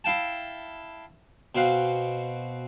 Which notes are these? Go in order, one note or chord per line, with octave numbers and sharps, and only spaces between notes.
E4 F5 G5 A5
B2 C4 F5 F#5